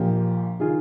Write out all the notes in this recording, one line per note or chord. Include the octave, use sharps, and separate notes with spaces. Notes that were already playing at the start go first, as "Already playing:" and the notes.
Already playing: A#1 A#2 F3 G4 A#4
D#3 F4 G#4